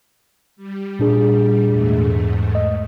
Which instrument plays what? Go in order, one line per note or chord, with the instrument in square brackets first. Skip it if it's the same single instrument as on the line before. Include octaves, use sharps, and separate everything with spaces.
[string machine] G3
[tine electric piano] A#2 D4 G#4
[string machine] E2 G#2 A3
[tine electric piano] D#5